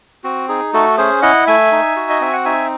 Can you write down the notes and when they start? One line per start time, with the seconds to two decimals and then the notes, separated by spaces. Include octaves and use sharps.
0.24 C4 F#4
0.49 D#4 G#4
0.73 A3 F#4 A4
0.97 C#4 G#4 C5
1.22 E4 D#5 F#5
1.47 A3 E5 G#5
1.72 D#4
1.96 F#4
2.10 D#5
2.20 C4 E5
2.33 F#5
2.45 D#4 E5 G#5